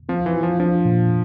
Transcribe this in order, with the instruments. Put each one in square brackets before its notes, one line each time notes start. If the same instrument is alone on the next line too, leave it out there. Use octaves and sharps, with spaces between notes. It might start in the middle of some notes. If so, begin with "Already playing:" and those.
[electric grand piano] F3 [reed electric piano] C4
[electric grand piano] E3
[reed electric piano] F4
[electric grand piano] F3
[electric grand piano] F3 [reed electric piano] D4
[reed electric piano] A#2